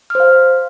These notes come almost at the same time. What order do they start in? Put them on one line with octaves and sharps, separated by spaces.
F6 C5 F5